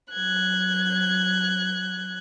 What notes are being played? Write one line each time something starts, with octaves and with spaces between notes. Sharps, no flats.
F#3 F#6 G#6